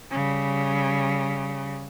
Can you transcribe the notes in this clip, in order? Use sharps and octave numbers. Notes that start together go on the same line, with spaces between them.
C#3 G3